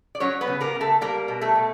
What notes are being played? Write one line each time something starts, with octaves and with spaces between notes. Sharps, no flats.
D5
F#3 C#4 C#5
B3 B4
C#3
A#3 A#4
C#3
A3 A4
G3 A#3 A#4
B2
A3 A4
B2